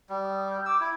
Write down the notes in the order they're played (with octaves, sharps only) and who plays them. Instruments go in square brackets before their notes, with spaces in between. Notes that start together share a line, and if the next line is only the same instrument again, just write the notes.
[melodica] G3
[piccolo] D#6
G6
[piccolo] D6 [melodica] E6
[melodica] E4 [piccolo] G#6